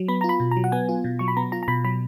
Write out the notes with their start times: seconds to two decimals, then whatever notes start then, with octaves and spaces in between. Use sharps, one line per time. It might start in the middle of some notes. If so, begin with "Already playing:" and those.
Already playing: F#3
0.08 B3 B5
0.21 F4 A#5
0.29 B5
0.40 B2
0.51 A#5
0.57 F#3
0.64 F#5
0.72 B3 G#5
0.89 F4
1.04 B2
1.19 F#3 C#6
1.28 B5
1.37 B3 A#5
1.52 F4 A#5
1.63 A#5
1.68 B2 B5
1.84 F#3 B5